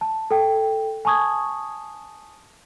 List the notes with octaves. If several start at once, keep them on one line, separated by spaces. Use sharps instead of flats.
A5
A4 G5
G#5 A5 C#6 D#6 G#6